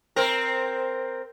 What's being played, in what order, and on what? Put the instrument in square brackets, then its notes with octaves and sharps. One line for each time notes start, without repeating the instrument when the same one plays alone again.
[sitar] C4 A#4